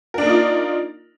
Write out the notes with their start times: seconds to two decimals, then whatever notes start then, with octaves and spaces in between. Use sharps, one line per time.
0.14 A#4
0.18 D4
0.22 A#3
0.25 D#4
0.29 F4